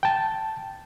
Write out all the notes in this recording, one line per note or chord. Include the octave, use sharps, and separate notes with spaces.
G5 A5